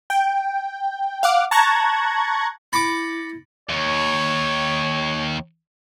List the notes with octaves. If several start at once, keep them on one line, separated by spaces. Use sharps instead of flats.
G5
F5 F#5 D6
A5 A#5 C#6 F#6 G#6 A#6
E4 B5 D6 A6 A#6 C#7
D#2 C#5